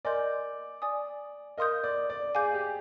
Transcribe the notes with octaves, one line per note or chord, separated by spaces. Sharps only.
A#4 D5 D#5 G#5 C6 G6
D5 G#5 D#6
A#4 D#5 F5 C6 D#6 G6
D5
D5
G#4 F5 G#5 D6 G6
G4